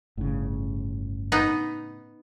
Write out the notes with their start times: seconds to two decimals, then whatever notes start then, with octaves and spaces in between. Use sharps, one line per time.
0.17 G1 A2 C#3
1.32 B3 D#4